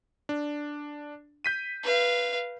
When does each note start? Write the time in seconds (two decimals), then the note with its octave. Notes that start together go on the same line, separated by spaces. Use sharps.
0.29 D4
1.44 G6 B6 D#7
1.84 B4 F5